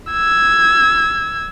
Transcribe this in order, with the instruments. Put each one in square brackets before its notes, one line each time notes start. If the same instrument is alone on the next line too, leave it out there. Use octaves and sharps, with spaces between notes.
[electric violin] E6 G#6